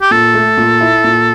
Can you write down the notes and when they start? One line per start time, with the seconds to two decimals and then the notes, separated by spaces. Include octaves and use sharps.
0.01 G4
0.11 A#2 A4
0.34 A3
0.57 A#2
0.81 E4
1.04 A#2